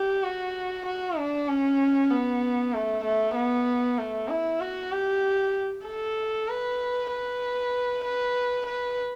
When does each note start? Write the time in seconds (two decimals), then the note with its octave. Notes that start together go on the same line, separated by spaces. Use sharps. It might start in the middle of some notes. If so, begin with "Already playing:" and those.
Already playing: G4
0.23 F#4
0.86 F#4
1.17 D4
1.48 C#4
2.11 B3
2.74 A3
3.05 A3
3.35 B3
3.98 A3
4.29 E4
4.61 F#4
4.92 G4
5.85 A4
6.48 B4
7.11 B4
8.04 B4
8.67 B4